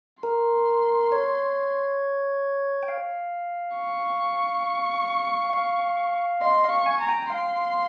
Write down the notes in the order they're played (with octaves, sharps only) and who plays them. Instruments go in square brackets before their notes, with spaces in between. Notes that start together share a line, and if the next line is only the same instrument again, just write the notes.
[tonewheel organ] A#4 [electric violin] C6
[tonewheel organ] C#5
G5
F5
[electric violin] C#6
[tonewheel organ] F5
[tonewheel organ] D#5 [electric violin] C6
[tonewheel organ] F5
[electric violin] C#6
[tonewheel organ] G#5
[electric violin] A#5
[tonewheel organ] G5
[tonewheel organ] F5 [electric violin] C6